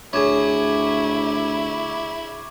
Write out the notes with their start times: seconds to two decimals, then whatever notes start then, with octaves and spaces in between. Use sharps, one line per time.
0.13 D2 E4 G#4 C#5 C#6 D6 G#6